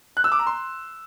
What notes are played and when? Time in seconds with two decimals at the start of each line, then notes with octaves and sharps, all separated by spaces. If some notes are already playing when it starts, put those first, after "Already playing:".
0.17 F#6
0.24 E6
0.32 D6
0.39 A#5
0.47 C6